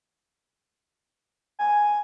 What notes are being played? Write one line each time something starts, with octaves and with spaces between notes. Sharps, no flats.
G#5